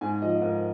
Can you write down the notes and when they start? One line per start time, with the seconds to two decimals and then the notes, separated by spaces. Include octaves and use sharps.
0.01 G#2 G#5
0.22 F3 D#5
0.41 G#2 A#4